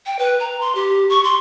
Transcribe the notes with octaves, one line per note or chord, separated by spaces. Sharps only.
G5
B4
A#5
C6
G4
C#6
C6